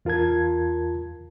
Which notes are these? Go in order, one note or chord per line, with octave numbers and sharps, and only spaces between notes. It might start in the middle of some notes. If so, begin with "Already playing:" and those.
E2 F4 A#4 A5 G#6